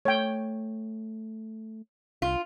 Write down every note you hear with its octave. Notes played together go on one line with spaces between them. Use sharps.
A3 C#5 G5
C2 F4